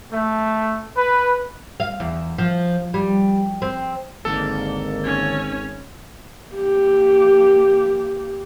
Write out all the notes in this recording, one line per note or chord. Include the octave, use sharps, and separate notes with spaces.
A3
B4
F5
E2
F3
G3
C4
G#1 D3 D#3 A#3 A4
C#4 C#5
A#3 G4